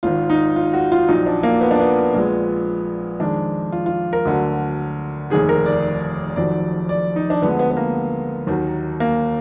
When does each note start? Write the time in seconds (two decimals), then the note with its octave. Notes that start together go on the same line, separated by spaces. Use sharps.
0.03 G#1 G#2 D#3 F4
0.30 D#4
0.56 F4
0.73 F#4
0.92 F4
1.09 A#1 A#2 F#3 D#4
1.26 D4
1.43 A#3
1.61 B3
1.71 D4
1.81 B3
2.14 A#1 A#2 F3 G#3
3.20 F2 D#3 G#3 D4
3.72 F4
3.86 F4
4.13 A#4
4.25 D2 D3 F#3
5.30 F1 D#2 D#3 G#4
5.49 A#4
5.66 D5
6.36 F1 F2 D#3 F#3 D5
6.89 D5
7.16 D#4
7.30 D4
7.42 D2 D3 F3 G#3 B3
7.59 B3
7.71 B3
7.77 A#3
8.47 D#2 D#3 F#3
9.00 A#3